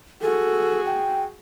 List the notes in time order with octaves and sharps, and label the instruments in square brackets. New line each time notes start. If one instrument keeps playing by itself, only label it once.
[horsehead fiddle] F#4 G#4 [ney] A4
[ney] G5